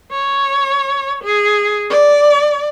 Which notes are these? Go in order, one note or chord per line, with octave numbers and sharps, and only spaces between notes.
C#5
G#4
D5